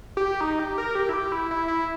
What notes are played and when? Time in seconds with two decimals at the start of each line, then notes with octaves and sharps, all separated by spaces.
0.17 G4
0.41 D#4
0.59 G4
0.78 A#4
0.95 G4
1.09 E4
1.13 G4
1.32 E4
1.51 E4
1.68 E4